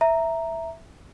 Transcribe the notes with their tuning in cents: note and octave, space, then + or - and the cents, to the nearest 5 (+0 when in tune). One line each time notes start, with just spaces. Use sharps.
E5 +0 A#5 -5